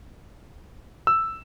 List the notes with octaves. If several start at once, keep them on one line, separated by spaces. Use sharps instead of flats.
E6